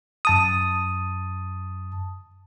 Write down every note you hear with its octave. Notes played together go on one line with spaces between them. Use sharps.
F#2 A5 D#6